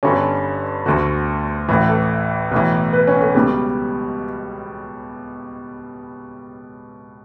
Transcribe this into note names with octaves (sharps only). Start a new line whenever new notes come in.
G1 G2 D3 C#4
D2 D3 F#4
A1 A2 E3
A4
B1 A2 E3
B4
C#4
A3
C#2 B2 G3